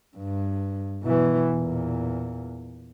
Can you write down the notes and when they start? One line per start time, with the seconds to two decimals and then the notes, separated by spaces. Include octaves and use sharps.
0.17 G2
1.03 B2 E3
1.52 E2 A#2